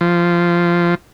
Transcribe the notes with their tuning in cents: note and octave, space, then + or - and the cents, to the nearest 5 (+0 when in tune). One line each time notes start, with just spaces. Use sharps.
F3 -10